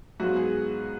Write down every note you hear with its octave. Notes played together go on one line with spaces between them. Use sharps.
G#2 F#3 B3 F4 F#4
G#4